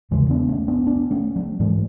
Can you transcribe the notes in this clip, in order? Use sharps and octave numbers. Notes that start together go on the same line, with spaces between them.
E2 C#3 E3 G#3
B3 D4
A3 C#4
B3 D4
B3 D4
A3 C#4
F#3 A3
G#2 E3 G#3